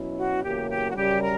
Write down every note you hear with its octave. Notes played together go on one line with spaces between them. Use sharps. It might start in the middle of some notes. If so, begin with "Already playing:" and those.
Already playing: B2 F#3 C#4 E4
F#4
E2 C#3 F#3 A#3 G4
G4
F#4
F#2 C#3 G3 G4
A#4